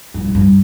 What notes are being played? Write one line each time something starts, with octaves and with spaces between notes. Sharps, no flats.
G2
G2
G2